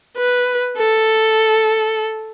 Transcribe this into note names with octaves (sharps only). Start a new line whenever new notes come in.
B4
A4